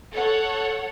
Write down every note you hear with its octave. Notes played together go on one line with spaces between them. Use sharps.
A4 C#5 F#5